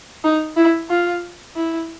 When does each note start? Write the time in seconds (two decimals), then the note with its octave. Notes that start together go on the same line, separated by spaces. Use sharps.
0.24 D#4
0.57 E4
0.90 F4
1.56 E4